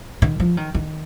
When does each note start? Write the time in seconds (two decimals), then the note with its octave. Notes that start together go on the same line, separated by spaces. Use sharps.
0.22 D#3
0.40 F3
0.57 D#3
0.75 D#3